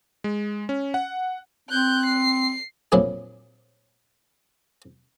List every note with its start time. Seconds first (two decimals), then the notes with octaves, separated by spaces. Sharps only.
0.24 G#3
0.69 C#4
0.94 F#5
1.69 C4 F#6 G6
2.05 C7
2.92 F2 A#2 F#3 D4 E4 G#4